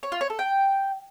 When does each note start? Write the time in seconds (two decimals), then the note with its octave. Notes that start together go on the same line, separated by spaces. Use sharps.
0.03 C#5
0.12 F4
0.21 C#5
0.30 A4
0.39 G5